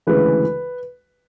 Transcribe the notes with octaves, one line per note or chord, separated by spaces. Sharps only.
D2 C#3 E3 G#3 B4